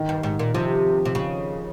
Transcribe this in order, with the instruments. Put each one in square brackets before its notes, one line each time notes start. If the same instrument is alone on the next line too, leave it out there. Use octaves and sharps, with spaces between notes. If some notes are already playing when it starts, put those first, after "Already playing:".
Already playing: [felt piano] D#3
[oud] G2
G#2
A#2
[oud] C3 [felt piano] F3
[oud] C3
C#3